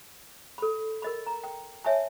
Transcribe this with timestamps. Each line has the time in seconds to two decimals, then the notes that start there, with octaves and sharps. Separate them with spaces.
0.58 A4 B5
1.02 A#4 D#5 B5
1.26 A#5
1.44 G5
1.85 C#5 E5 G#5 A5